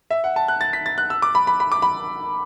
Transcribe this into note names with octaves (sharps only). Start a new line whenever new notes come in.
E5
F#5
A5
F#6
A6
B6
A6
F#6
E6
D6
B5
B5
B5
D6
B5